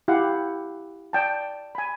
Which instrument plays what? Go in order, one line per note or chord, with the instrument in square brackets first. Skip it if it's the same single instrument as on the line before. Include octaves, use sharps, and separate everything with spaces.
[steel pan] E4 G4 F5 F#5
D5 G5 A5
G#5 B5